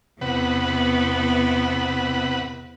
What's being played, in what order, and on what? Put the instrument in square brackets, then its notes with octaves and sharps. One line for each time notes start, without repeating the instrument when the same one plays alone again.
[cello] E2 B3 [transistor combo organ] C3 B4 F#5